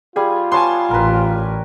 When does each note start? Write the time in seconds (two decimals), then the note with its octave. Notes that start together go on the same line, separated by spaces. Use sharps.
0.16 G3 F4 G#4 G#5
0.52 B3 C#5 G#5 A5 C6
0.91 A1 A#4 B4